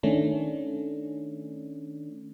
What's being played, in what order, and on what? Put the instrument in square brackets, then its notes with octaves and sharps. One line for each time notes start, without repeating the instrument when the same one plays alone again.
[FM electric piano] D#3 A3 C#4 D4